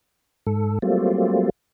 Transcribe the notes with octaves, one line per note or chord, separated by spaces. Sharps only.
G#2 A4
F#3 G3 A3 A#3 C4 F4